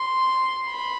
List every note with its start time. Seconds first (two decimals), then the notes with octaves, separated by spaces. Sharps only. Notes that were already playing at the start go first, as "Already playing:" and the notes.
Already playing: C6
0.69 B5